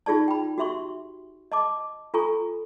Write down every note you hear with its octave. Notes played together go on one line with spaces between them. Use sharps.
D#4 F4 G#4 D5 A5
G5 B5
F#4 G4 E5 C6 C#6
D#5 A5 D6
F4 A4 G#5 A#5 C#6